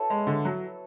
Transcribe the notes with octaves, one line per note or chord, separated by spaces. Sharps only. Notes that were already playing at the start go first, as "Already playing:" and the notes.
Already playing: E4 F#4 A4 B4 C#5
G#3
D3
F#3